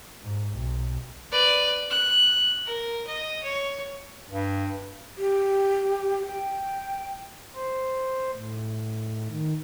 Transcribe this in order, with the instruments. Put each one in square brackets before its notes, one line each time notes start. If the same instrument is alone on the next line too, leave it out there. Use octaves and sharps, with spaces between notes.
[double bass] G#2
B1
[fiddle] B4 D5
F#6
A#4
D#5
C#5
[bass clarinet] G2
[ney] G4
G5
[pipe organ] C5
A2
D#3